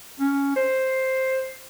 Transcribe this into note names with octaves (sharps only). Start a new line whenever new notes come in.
C#4
C5